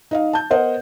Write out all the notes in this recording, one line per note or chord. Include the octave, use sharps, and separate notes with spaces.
D#4 D#5 F5
A5 G6
B3 A#4 C5 D#5 F#5